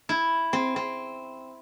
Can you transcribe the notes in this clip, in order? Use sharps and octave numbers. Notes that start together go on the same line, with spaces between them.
E4
C4
C4